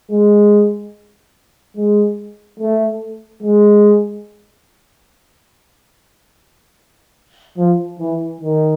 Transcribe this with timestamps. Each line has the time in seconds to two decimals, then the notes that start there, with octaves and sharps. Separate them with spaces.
0.11 G#3
1.77 G#3
2.59 A3
3.43 G#3
7.57 F3
7.99 E3
8.41 D#3